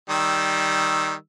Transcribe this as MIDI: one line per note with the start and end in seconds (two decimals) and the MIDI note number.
0.10 1.13 51
0.10 1.13 55
0.10 1.13 88